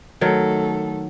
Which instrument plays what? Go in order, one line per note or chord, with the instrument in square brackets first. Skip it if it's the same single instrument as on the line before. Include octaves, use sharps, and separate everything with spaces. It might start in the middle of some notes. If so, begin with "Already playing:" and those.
[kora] D#3 F#3 [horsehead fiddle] A3 A4